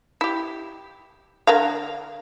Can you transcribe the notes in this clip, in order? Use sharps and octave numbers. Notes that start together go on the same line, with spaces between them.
E4 G4
D3 A#4 F5